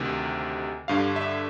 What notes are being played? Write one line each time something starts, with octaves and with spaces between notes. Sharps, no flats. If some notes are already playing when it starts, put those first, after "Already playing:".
Already playing: D2 C3 D#3
G2 D3 F5
E5